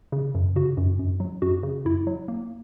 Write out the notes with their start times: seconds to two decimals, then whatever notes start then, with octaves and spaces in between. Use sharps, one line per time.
0.12 C#3
0.35 F#2
0.56 C#3 F#4
0.77 F#2
0.99 F#2
1.20 F#3
1.42 F#2 F#4
1.63 C#3
1.85 F#2 E4
2.07 F#3
2.28 A#3